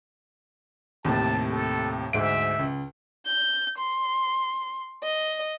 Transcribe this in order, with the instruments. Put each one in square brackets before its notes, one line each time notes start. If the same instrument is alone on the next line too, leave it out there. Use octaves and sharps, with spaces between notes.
[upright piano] D#2 A2 C3 [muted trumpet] A5
[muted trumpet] A4
[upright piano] D2 G#2 D7 [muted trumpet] E5
[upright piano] C#2
[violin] G6
C6
D#5